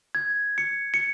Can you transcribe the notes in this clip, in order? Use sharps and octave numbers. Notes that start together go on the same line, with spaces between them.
G#6
C#7
C#7